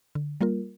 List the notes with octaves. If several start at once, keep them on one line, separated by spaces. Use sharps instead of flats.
D3
G3 A#3 F4 A#4